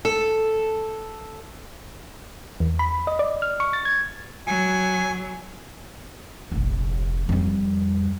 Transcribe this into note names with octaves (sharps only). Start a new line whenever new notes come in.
A4
E2
B5
D#5
D5
F6
C#6
A6
G#6
F#3 G#5
F1 A#1
F2 G3